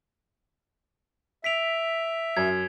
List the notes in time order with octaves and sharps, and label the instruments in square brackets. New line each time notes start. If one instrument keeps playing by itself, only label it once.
[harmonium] E5 [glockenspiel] B6 D7 F7
[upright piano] F#2 [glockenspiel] G#6